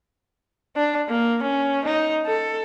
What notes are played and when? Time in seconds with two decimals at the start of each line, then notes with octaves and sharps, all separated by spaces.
0.76 D4
1.09 A#3
1.43 C#4
1.85 D#4
2.26 A4